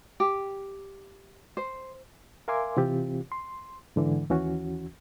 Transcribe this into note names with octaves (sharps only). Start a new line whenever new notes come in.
G4
C5
A#4 E5 F5 G#5 C6 D6
C3 E3 C4 F4 G4
C6
G#2 D3 E3
D#2 E3 C#4 F#4